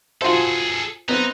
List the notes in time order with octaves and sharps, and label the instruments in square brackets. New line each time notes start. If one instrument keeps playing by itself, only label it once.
[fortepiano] F4 F#4 C5 [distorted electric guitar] G#4 A4
[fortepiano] B3 C4 [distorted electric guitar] D#4